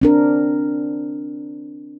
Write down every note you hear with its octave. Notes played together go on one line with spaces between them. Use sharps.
C4 D4 A#4